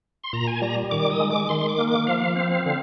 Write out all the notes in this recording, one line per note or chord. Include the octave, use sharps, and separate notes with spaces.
C6
A#2 A#5
G#5
G3 A#5
D#3 D6
D#6
G#3
D6
D#3 C6
D6
A#3
D6
F3 F5
C4
D3